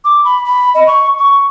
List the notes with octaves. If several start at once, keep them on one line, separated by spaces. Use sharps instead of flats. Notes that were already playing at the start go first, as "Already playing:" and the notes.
D6
B5
B5
D#5
C#6
C#6